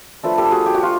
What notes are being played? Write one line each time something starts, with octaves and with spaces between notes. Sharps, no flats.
F3 A3 D4 F4 A4 B4
G4 A4
F#4 G#4
G4
F#4
F4